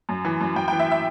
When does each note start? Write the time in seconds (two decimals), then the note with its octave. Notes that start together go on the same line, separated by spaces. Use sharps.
0.09 F#2
0.25 E3
0.41 F#2
0.55 F#2 G5
0.68 G5
0.72 E3
0.79 E5
0.91 E5